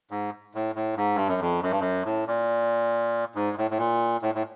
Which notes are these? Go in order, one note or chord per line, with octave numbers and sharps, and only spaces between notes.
G#2
A2
A2
G#2
G2
F#2
F2
F#2
G2
F#2
A2
A#2
G#2
A2
A2
A#2
A2
A2